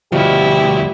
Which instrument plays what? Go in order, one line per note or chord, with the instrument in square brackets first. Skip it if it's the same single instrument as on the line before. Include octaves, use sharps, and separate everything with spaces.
[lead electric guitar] D2 B2 [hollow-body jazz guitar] F3 G3 F#4 [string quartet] E4 [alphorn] G4